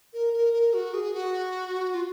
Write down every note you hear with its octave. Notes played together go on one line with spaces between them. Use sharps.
A#4
A#4
A#4
F#4
G#4
F#4
F4